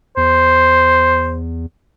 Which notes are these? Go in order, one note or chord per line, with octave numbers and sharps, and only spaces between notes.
E2 C5